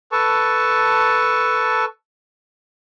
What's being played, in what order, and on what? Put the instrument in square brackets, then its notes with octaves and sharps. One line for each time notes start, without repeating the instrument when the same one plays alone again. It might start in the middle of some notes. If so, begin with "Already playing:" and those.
[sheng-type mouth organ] A4 B4 A5 C#6